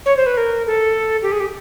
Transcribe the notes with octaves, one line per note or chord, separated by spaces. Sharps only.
C#5
C5
B4
A#4
A4
G4
G#4
G4